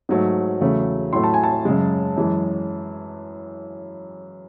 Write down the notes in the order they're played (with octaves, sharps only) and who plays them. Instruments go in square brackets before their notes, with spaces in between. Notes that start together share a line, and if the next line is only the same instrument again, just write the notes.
[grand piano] G#2 F#3 A3
E2 C#3 F#3 A3
A2 F#3 A3 C6
A5
G#5
A5
F#2 C#3 G#3
F#2 E3 G#3